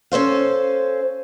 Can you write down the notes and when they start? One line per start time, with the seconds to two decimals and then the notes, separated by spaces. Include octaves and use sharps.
0.12 C#4 A4 C5 F5